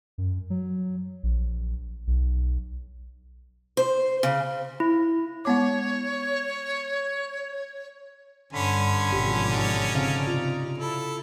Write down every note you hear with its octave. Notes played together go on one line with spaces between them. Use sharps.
F#2
F#3
A#1
B1
C5
C#3
E4
G#3 B3 C#5 D6
G2 D3 C#4 G#5 B5 C6
G#1 B2 F3 G4
D#4 D5 F6
C#3 C4 F5
C3 F4
E4 A4